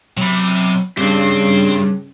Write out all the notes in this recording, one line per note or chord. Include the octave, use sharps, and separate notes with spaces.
C3 F#3 B5
G2 C#3 C4 D4 G4